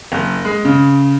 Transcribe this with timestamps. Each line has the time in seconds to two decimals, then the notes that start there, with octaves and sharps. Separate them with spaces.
0.12 F#1
0.45 G#3
0.65 C#3